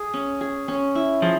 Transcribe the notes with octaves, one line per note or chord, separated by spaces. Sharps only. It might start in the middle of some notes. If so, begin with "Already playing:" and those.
Already playing: G#4
C#4
G#4
C#4
E4
F3 G#4